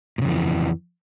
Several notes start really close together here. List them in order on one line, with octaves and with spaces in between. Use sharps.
A2 C#3 F2 E3